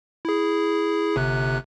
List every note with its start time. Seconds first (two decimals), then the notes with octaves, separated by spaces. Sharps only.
0.25 E4 G#4
1.16 G1 C3 F#6